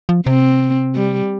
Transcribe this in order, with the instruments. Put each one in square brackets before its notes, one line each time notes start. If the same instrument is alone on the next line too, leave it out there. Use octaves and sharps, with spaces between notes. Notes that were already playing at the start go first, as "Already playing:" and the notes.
[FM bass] F3
[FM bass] C3 [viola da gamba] C4
[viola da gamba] G3